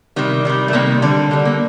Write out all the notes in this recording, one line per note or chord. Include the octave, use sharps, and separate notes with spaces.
C3 D#3 G3
C3 D#3 G3
A3
C3 D#3 G3 A#3
D3 G3
D3 G3
A#3